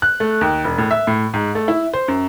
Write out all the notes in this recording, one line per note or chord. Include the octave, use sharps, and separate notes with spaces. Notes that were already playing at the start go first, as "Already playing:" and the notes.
F#6
A3
D#2
E1
A2
E5
A2
G#2
A3
E4
C5
F#2